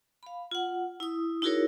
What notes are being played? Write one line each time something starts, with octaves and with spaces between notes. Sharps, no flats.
F5 B5
F4 F#5
E4 D#6
D#4 E4 F#4 G#4 A#4 C#5